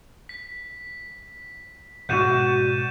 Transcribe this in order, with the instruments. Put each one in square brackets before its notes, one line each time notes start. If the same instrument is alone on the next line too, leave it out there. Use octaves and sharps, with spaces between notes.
[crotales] B6
[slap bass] G#2 B2 [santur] F#4 D5 F#5 [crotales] G6 D#7 E7